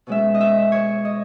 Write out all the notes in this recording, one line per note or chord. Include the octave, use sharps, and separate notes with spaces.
B2 G#3 C#4 E5
D#5
E5
C#5
D#5